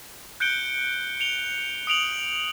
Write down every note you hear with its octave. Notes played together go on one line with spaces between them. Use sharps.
F#6 G6 C#7 D7 G7
C#7 F7 G7
D#6 D7 F7 F#7